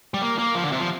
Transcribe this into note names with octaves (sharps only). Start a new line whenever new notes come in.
G3
A#3
A#3
F3
D3
C3
F3